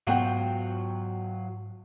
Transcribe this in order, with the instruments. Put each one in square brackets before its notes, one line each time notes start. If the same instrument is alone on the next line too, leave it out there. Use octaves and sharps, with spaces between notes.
[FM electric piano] G#2 [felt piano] B2 F#5 G5 [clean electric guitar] F#3 F4 F#4